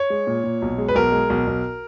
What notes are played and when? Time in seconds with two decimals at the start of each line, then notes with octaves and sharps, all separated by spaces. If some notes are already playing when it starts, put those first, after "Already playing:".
Already playing: C#5
0.10 G#3
0.27 A#2
0.44 A#2
0.62 B1
0.78 G#3
0.88 B4
0.95 B1 A#4
1.12 G#3
1.30 B1
1.47 B1